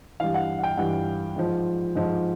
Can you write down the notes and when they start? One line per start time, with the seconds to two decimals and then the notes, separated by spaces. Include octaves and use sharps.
0.20 G2 E3 F5
0.34 F#5
0.59 F#5
0.64 G5
0.77 G2 E3 F#5
1.36 G#2 F3
1.96 G#2 F3